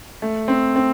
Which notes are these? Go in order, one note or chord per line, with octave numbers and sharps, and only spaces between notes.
A3
C4
C4